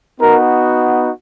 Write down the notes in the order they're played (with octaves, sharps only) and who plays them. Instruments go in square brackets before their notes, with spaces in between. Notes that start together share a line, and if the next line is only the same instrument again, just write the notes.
[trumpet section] B3 D#4 F#4 A#4